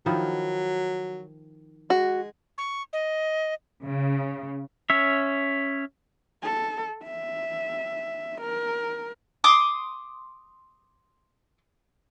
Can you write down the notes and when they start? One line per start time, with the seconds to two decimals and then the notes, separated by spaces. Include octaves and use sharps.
0.06 D#3 F3 F#3 E4
1.90 G#3 F#4
2.58 C#6
2.93 D#5
3.86 C#3
4.90 C#4 C#5 E5
6.43 A4
7.04 E5
8.42 A#4
9.44 C6 D6 D#6